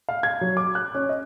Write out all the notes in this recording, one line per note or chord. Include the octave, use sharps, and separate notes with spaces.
F5
G#6
F#3
D6
F#6
C#4
D#5